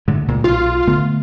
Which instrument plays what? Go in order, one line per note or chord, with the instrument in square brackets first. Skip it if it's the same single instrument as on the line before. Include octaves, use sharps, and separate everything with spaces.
[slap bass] A2 D3 G#3
C#2 A#2 C#3
[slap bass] B1 [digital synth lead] F4
[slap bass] D3 A3 B3